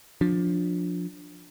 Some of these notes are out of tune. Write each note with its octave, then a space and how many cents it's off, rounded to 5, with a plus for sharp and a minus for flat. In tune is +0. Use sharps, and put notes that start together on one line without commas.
F3 +20 D4 +0